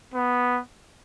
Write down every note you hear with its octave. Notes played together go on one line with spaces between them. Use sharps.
B3